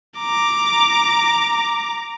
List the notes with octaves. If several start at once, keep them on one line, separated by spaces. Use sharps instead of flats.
A#5 D6